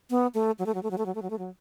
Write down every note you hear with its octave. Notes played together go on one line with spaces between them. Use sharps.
B3
A3
F#3
A3
F#3
A3
F#3
A3
F#3
A3
F#3
A3
F#3